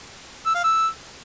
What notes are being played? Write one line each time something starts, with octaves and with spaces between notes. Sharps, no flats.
E6
F5
E6